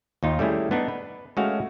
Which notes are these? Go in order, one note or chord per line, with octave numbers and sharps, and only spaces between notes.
D#2 D#4 F4
G3 A3 C#4 E4 G#4
B3 D4 D#4
B4
G#3 A3 C#4 F#4 F5